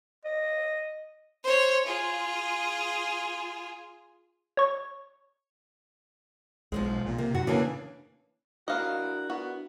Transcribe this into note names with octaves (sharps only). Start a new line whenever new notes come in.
D#5
C5 C#5
F4 G#4
C#5 C#6
B1 F3 F#3 G#3
A#2
C3 A#3
F#2 F#4
C#3 E3 A#3 D4
D4 E4 F#4 A#4 D#5 F5
B3 F#4